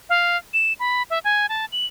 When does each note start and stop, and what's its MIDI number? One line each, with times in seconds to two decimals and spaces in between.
0.09 0.37 77
0.54 0.73 100
0.80 1.03 83
1.10 1.19 76
1.24 1.47 80
1.49 1.65 81
1.72 1.86 102